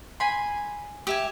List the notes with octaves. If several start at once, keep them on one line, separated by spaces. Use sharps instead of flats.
G#5 B5 C6
G4 E5 G#5